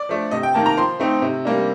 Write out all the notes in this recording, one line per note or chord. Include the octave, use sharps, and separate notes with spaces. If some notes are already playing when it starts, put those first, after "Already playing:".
Already playing: D5
F3 A3 D4
C3 D#5
G5
D#3 A#3 A5
A#5
F3 C6
A3 C4 D#4
C3
G3 A#3 D4